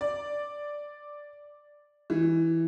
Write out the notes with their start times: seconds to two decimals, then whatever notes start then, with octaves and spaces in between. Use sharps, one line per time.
0.01 D5
2.10 E3